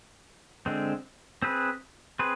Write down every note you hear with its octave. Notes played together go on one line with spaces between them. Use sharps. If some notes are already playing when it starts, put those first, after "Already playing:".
D3 G#3 C4
C4 G#4 B4
C4 G#4 B4